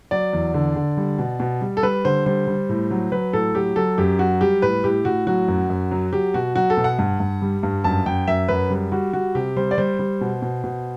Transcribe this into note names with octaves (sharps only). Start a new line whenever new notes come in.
F#3 D5
E2
D3
D3
G3
B2
B2
G3
A4
G3 B4
D3 C5
G3 C5
G3
A2
F#3
F#3 B4
A2 A4
F#3 G4
F#3 A4
F#2 G4
F#3 F#4
G3 G4
A2 B4
A2 G4
A2 F#4
F#3 F#4
F#2
F#2
F#3
F#3 G4
B2 F#4
F#3 F#4
A4
B2
F#5
G2
G2
G3
G2
F#2 A5
F#2 G5
F#2 E5
F#2 B4
G3
G3 F#4
G3 F#4
C3 G4
G3 C5
D5
G3 C5
G3
B2
B2
B2